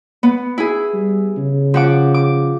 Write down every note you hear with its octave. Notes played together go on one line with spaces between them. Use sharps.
B3
E4 G#4
G3
C#3
F3 F#5 D6
D6